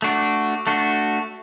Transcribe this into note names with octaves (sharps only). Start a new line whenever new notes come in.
A3 D4 F#4
A3 D4 F#4